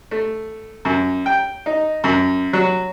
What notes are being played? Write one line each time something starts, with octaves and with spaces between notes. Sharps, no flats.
A3
F#2
G5
D#4
F#2
F#3